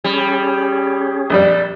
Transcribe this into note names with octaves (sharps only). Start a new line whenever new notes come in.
G3 C#4 G#4
A#1 F2 G3 D5